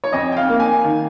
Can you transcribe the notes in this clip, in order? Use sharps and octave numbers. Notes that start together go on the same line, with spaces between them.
C#5
F2 D#5
G5
F5
A#3
G#5
D#3